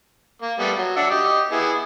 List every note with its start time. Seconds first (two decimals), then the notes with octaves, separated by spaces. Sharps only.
0.42 A#3
0.59 G3 A3 B3
0.78 F#3
0.97 D4 E5 F#5
1.11 G4 D#5
1.52 B3 E4 G#4